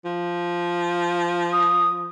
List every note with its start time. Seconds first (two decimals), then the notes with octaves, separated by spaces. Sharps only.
0.05 F3
1.53 D#6